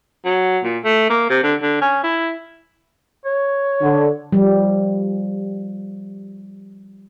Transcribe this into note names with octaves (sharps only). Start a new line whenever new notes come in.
F#3
A#2
A3
A#3
C3
D3
D3
C#4
E4
C#5
D3
F3 G3